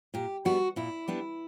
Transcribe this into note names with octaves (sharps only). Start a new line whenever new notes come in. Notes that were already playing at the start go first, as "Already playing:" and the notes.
A#2 G4
G3 B3 D4 F#4
A#2 E4
G3 B3 D4